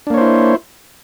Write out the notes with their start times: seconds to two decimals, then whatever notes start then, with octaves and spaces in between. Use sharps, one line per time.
0.07 D4
0.10 A#3
0.14 C#5
0.18 C5
0.21 E4